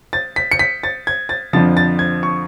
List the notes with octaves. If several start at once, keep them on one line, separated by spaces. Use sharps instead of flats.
A6
B6
C#7
B6
A6
G#6
A6
F2 D3 F3 A6
A6
G#6
C#6